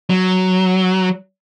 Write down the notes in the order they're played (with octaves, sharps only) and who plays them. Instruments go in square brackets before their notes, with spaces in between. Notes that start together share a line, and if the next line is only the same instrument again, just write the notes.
[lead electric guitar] F#3